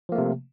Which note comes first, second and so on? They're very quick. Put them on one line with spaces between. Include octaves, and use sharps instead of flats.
F3 A#3 A3 C3